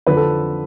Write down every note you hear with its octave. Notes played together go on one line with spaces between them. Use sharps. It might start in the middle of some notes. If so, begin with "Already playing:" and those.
F2 D3 F3 B4
A4